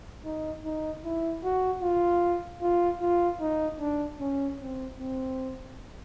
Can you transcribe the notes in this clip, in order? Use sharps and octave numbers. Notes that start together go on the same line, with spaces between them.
D#4
D#4
E4
F#4
F4
F4
F4
D#4
D4
C#4
C4
C4